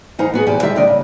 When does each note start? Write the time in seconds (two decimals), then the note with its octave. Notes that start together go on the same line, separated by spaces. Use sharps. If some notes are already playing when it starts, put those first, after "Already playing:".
0.19 E3 D#4 A#4 C5 F#5 A#5
0.34 B3 F#4 G#4
0.46 E2 B2 G4 C5 G#5
0.62 D3 D#3 G4 A#4 E5
0.75 D#2 C3 D#3 D4 D5 D#5
0.88 C#3